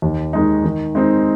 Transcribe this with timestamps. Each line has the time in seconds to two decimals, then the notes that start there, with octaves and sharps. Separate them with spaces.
0.02 D#2
0.33 D#3 G#3 D#4
0.64 D#3
0.95 G#3 C4 D#4